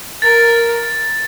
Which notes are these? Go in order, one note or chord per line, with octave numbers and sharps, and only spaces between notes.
A#4 A6